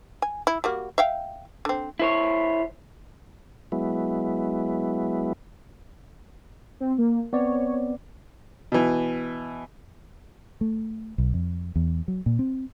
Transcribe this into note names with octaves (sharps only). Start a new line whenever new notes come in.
G#5
E4
G3 A#3 F#4
E5 F5 G5
D3 C4
E4 C5 C#5
F#3 G#3 B3 E4
C4
A#3
B3 C4 C#5 D5
B2 E3
A3
B1
F2
E2
F#3
A#2
C4